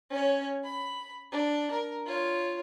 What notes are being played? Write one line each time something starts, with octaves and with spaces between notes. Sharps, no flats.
C#4 C#5
B5
D4
A#4
F4 C#5